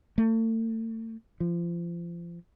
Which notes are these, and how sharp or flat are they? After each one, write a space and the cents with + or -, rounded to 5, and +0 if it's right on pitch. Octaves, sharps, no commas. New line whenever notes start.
A3 +35
F3 -30